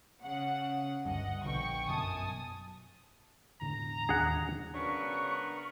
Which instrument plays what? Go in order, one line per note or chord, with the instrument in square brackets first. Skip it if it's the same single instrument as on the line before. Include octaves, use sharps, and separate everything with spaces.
[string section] C#3 F#5
[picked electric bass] G1 D2 G2 [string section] D#5 F#5
[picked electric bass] A#1 B2 D3 [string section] G5 C#6
[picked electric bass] G1 F#2 B2 [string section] G#5 A5 D#6
[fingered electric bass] E1 A2 D3 [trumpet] A#5
[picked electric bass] D#2 D4 [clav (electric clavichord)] G#4 F#5
[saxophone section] C#3 F#3 D4 [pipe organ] B3 A#4 B4 [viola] C#6